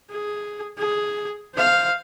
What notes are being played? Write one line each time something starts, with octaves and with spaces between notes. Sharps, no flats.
G#4
G#4
C5 F5